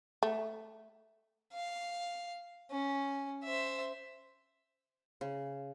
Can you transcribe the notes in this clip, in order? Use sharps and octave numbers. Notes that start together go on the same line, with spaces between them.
A3
F5
C#4
C5 E5
C#3